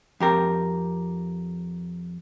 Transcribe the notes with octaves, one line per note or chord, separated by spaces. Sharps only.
F2 G4 A#4